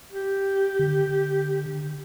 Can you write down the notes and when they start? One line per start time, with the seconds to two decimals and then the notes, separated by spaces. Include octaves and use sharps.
0.12 G4
0.79 D3